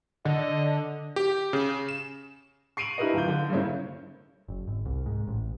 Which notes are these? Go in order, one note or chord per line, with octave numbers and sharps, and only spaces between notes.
D3 D#5
G4
C#3
E7
C#6 C7 D7 D#7 F7 F#7
D4 E4 G4 A#4 B4 D#5
D1 F4 G6
D3
G2 C#3 A#3 C4 C#4 E4
F#1
G#1
C2
G#2
A1